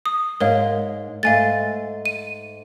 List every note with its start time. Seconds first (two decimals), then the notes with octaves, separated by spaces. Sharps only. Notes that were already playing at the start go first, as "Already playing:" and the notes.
0.06 D#6
0.40 G#2 D#4 A#4 C#5 F5
1.23 G#2 A3 F5 G#5 A6
2.06 D#7